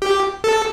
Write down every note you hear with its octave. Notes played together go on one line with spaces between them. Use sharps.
G4
A4